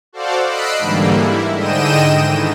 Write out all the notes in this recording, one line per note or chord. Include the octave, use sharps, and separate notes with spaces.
F#4 A4 C5 D5 F5 F#5
D#5 B5 E6 F#6 C7 D7
G#2 D3 E3 G3 A#3
E4
G#2 D3 D#5 G5 D#7 E7
D#3 E3